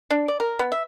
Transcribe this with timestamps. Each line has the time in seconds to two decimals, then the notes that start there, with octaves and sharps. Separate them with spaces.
0.10 D4
0.28 D5
0.40 A#4
0.59 B3
0.72 E5